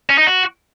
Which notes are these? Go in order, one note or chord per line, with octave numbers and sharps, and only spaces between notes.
C#4
D#4
F#4